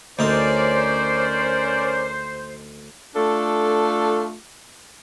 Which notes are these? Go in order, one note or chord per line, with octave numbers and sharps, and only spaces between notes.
D2 C#4 D#4 A#4 C5 D5 A5
A3 D4 F4 A4